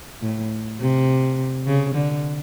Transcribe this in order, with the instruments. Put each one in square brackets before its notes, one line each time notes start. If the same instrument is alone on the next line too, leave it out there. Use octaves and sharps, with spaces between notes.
[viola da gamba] A2
C3
C#3
D3